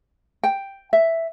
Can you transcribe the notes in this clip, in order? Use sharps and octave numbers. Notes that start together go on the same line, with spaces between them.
G5
E5